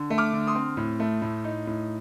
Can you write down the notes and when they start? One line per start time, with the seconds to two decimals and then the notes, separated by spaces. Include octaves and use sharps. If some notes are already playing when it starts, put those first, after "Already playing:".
Already playing: D3
0.10 A3
0.18 D6 F6
0.33 D3
0.47 C6 D#6
0.55 C4
0.77 A2
1.00 A3
1.22 A2
1.44 D#4
1.67 A2